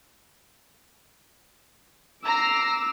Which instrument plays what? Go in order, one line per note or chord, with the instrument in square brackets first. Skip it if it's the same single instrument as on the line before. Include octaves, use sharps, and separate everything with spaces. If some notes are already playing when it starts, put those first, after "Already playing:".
[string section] A#5 A#6 C7 [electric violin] D6 E6